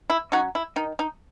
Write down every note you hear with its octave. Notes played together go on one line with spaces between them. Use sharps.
E4
F#3 C#4 D#4 F#4
E4
D#3 D#4
D#4